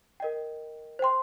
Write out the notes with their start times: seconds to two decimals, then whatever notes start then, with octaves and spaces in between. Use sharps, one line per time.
0.20 A#4 D#5 G5
0.99 C5 G5 C6